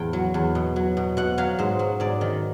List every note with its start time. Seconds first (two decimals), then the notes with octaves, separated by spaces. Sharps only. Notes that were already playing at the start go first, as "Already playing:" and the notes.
Already playing: E2 A2 G5
0.13 F#3
0.34 E2
0.55 B2
0.76 F#3
0.97 B2
1.17 B2 F#5
1.38 F#3 F5
1.59 G#2 C5
1.79 F#3
2.00 G#2 D5
2.21 D#3